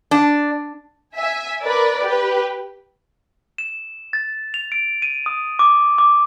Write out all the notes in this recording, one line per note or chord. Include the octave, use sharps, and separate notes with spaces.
D4
E5 G#5
A#4 B4 D5
G4 B4
E7
A6
F7
D7
D#7
D#6
D6
D6